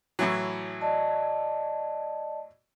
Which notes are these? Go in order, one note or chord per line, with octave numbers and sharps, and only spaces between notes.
A2 E3 F#3
D5 D#5 A5